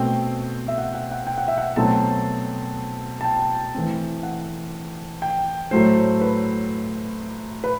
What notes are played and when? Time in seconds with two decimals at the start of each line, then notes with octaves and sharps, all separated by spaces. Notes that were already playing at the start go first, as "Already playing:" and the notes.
Already playing: B2 A3 C4 G5
0.68 E5
0.78 F#5
0.94 F#5
1.11 F#5
1.27 G5
1.38 F#5
1.48 E5
1.58 F#5
1.76 B2 F#3 A3 C4 A5
3.21 A5
3.24 G5
3.75 E3 A3 C4
4.23 F#5
5.22 G5
5.71 A2 F#3 A3 C5
6.21 B4
7.64 B4